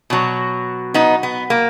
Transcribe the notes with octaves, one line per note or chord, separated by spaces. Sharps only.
B2 F#3
B3 D#4
B3
A#3